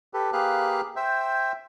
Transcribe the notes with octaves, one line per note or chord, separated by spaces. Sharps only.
G4 A4 B4
A#3 G4 G#4 B4 F5 F#6
C5 E5 G5